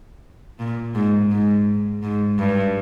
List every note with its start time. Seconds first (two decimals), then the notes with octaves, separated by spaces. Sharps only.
0.60 A#2
0.95 G#2
1.32 G#2
2.03 G#2
2.39 G2